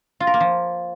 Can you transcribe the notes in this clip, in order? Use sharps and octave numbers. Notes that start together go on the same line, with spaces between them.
F4
A#4
A#3
F3